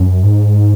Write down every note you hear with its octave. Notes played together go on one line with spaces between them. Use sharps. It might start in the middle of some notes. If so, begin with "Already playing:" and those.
Already playing: F#2
G#2